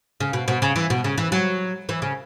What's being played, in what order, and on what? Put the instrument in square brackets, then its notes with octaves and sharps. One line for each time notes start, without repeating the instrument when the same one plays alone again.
[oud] C#3
B2
B2
C#3
E3
B2
C#3
E3
F#3
E3
C#3